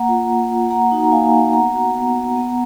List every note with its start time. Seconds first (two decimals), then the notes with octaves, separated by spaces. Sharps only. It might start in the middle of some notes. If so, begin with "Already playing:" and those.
Already playing: A#3 F#5 A#5
0.08 F4
0.29 A#3
0.50 F4
0.70 A#3 F#5 A#5
0.91 D#4 F#4
1.04 A#5
1.12 A#3 F5 G#5
1.33 D#4 F#4
1.53 B3 F#5 A#5
1.74 F#4
1.95 B3
2.16 F#4
2.36 B3